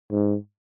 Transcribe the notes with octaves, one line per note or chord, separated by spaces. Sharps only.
G#2